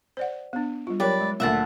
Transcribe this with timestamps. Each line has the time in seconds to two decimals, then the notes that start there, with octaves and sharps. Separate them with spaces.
0.17 C5 D5 F#5
0.53 B3 D4
0.87 G3 F4
1.00 F#3 G4 A#4 B4 C#5 D5
1.21 G#3
1.40 D2 A#2 E5 F#5 A5